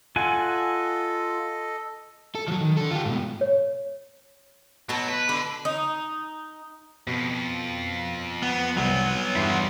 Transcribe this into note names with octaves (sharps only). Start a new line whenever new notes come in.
F4 A4 D#5 F#5 G#5
A4
F3 F#3
D#3
D3 A4
F4 G4
G#2 B2
C#5
B2 F#3 A5
B4
D3 B4
D#4
F2 B2
B3
C2 F#3 B3
E2 G2 G3 E4 C6